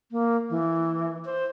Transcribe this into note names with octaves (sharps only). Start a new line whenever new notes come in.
A#3
E3
C5